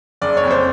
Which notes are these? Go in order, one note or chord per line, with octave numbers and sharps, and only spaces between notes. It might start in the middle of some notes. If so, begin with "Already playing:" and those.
F#1 D5
C#5
F2
C5